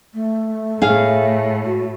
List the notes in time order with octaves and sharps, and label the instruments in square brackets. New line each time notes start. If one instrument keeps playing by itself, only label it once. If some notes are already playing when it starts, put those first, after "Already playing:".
[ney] A3
[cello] A2 [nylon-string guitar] G#4 F5
[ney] F#4